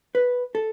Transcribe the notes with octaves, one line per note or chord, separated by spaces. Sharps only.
B4
A4